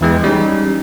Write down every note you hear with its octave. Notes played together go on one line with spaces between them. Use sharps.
E2 E3 G#3 G5
G3 C#4 D#4